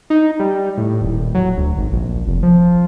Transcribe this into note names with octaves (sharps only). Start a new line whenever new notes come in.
D#4
G3
A2
D#1
F#3
D2
G#1
A#1
F1
F3